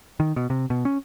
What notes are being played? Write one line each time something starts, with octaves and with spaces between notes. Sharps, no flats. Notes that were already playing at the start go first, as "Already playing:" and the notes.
D#3
B2
C3
B2
C#4